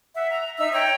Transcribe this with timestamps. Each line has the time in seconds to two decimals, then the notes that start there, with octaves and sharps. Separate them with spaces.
0.15 E5 F#5
0.30 A#5
0.57 D#4 E5 E6
0.73 C#5 G5 A#5